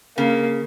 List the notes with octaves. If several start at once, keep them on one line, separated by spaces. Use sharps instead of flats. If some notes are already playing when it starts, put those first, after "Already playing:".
C#3 A#3